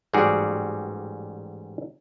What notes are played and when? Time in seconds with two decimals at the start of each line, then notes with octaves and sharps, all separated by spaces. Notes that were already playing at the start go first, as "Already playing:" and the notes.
0.13 A1 G#2 G3 F#4 G#4 D5